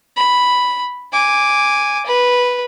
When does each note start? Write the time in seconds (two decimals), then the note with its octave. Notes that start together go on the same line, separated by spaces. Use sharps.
0.17 B5
1.12 G#5 D6
2.06 B4